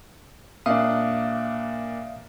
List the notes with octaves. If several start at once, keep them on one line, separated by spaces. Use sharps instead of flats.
A#2 D4 E5 F5 D#6